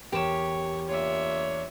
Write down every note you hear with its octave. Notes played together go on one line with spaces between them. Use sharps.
E2 G4 A#4 C#5 E7
A#3 D4 F4 C#5 E5